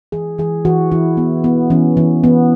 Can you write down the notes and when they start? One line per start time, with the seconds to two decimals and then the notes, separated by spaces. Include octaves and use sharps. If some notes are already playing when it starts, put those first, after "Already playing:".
0.12 E3 G#4
0.38 E3 G#4
0.65 E3 F#4
0.91 E3 E4
1.17 B3
1.44 B3
1.70 E3 C#4
1.97 E3
2.24 B3